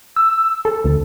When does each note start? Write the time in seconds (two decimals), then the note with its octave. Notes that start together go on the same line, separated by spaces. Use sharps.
0.16 E6
0.65 A4
0.84 D2